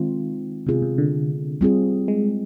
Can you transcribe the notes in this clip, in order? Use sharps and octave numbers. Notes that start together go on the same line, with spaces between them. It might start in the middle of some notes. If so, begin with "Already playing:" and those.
Already playing: D#3 G#3 C4 F4
C3 D#3 G#3 B3 F4 G#4
C3
D3
G3 C4 F4 G#4
G#3